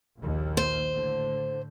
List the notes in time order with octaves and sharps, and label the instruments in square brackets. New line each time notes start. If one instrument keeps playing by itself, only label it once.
[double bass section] A#1 D#2
[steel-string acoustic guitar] C5
[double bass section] A2 D3